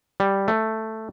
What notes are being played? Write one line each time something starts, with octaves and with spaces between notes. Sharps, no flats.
G3
A3